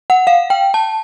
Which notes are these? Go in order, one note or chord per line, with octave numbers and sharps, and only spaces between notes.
F#5
F5
G5
A5